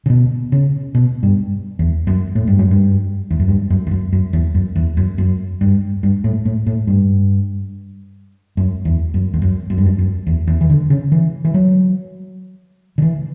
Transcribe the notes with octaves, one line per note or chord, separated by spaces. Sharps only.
C#3
B2
C#3
B2
G2
E2
F#2
A2
G2
F#2
G2
E2
F#2
G2
F#2
E2
F#2
F#2
E2
F#2
E2
F#2
F#2
G2
G2
A2
A2
A2
G2
F#2
E2
F#2
E2
F#2
F#2
G2
F#2
F#2
E2
E2
E3
D3
C#3
E3
E3
F#3
D3
E3